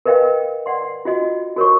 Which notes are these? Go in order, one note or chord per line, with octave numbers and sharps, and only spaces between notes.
A#4 B4 D#5 F5 G5
D5 F#5 C6
F4 F#4 D#5
F#4 A#4 C#5 C#6